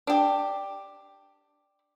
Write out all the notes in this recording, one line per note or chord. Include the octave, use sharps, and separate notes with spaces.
D4 G4